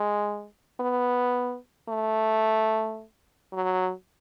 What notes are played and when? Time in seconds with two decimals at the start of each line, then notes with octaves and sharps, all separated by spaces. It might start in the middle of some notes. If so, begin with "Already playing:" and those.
Already playing: G#3
0.80 B3
1.89 A3
3.53 F#3